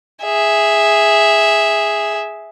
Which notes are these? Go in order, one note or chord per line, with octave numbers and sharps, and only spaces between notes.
G#4 E5